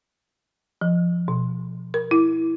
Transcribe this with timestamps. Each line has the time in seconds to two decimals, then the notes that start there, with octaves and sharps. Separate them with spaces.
0.81 F3
1.28 B2
1.94 A#4
2.11 E4